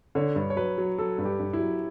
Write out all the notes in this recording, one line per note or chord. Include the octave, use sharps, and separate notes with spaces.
D3 C#5
G2
C#5
F#3 B4
F#3
F#3 A4
G2
G4
G2
E4
F#3